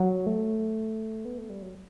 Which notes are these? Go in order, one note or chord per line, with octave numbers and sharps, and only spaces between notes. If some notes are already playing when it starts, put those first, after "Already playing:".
Already playing: F#3
A3
B3
A3
G3
F#3